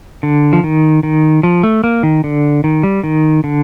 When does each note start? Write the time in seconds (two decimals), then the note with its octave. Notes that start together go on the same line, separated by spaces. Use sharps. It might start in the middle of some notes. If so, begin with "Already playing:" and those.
0.23 D3
0.53 F3
0.64 D#3
1.03 D#3
1.43 F3
1.63 A3
1.84 A#3
2.03 D#3
2.24 D3
2.64 D#3
2.83 G3
3.04 D#3
3.44 D3